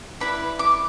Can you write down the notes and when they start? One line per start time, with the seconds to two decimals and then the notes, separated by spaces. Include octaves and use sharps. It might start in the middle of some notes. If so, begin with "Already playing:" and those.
0.20 E4 B4 D5 B5
0.59 D6